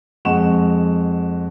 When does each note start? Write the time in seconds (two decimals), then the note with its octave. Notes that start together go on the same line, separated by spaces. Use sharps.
0.25 F2 G#3 D#5 F#5 C#6 E7